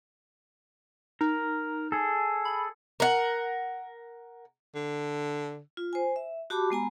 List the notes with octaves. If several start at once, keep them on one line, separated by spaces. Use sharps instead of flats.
D#4 A#4
G#4 A4
B5
A#4 F#5
D3
F4
C5 G#5
E5
F#4 G4 A5 B5 D6
G#3 B3 G#5 A#5